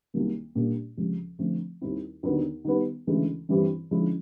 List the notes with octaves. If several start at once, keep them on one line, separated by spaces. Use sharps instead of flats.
C2 C3 D#3 F#3 A#3
A#2 G3 A#3 D4 G4
C#2 C3 F3
D3 F3 A3 C4
D#2 D#3 G3 C4 E4
D#2 D3 F#3 B3
D#3 G3 B3
D2 C#3 E3 G#3
G2 E3 G3 C4
D3 F3 G#3 C#4 E4